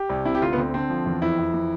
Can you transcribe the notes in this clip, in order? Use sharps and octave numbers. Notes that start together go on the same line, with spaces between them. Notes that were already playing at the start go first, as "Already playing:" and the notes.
Already playing: G4
C2
C3 E4
G4
D2 F4
B3
D2 C4
D3 C4
F3
E2
F2 E4
F2
E3